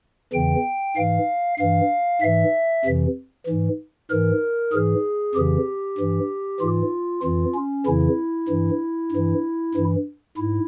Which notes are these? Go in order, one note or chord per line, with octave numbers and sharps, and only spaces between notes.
E2 C#3 E3 G5
G#2 E3 F5
G2 E3 F5
G#2 E3 E5
F2 C3 E3
G#2 E3
G#2 E3 A#4
G#2 E3 G#4
F2 C#3 E3 G4
G2 E3
G#2 E3 F4
F2 E3 F4
C#4
F2 C#3 E3 E4
G2 E3
G2 E3
G2 E3
G#2 E4